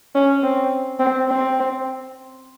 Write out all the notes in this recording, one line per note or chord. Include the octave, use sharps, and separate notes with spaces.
C#4
C4
C4
C4